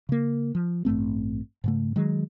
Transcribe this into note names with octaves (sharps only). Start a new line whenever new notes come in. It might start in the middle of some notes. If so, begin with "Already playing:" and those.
C#3 A#3
F3
A1 G2 A3 C4
G#2 C#3 A3
D#3 F#3 G#3